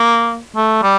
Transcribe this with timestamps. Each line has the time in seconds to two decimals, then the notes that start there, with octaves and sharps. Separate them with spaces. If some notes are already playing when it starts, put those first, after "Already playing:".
Already playing: A#3
0.56 A3
0.82 G3